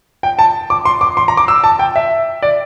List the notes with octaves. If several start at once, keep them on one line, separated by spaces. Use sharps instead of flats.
G5
A5
D6
C6
D6
C6
A#5
D6
E6
A5
G5
E5
D5